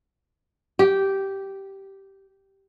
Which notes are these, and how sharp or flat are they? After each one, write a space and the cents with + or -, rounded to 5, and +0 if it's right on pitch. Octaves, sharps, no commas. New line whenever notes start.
G4 -10